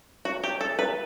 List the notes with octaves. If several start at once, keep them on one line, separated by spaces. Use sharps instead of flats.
F#4
G4
A4
B4